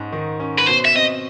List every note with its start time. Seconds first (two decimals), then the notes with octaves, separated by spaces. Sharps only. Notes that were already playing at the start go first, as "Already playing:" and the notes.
Already playing: G#2 G#3 C#4
0.12 D#3
0.40 C#4
0.59 B4
0.68 B2 C5
0.85 E5
0.95 C4 D#5